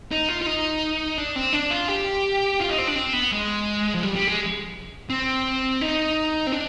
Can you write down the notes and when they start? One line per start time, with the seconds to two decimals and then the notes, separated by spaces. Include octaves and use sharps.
0.11 D#4
0.29 F4
0.42 F4
0.46 D#4
1.18 D4
1.36 C4
1.53 D4
1.71 F4
1.89 G4
2.61 F4
2.69 D#4
2.78 C4
2.87 D4
2.96 C4
3.13 B3
3.32 G#3
3.94 F3
4.03 G3
4.15 G3
4.27 G#3
5.10 C4
5.81 D#4
6.47 C4
6.52 D4